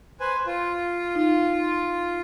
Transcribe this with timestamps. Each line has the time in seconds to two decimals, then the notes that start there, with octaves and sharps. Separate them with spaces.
0.20 B4 C5 G#5
0.47 F4
1.15 D#4